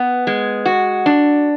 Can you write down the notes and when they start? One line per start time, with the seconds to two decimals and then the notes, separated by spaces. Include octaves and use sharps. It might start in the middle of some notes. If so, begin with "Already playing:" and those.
Already playing: B3
0.27 G#3
0.65 F#4
1.06 D4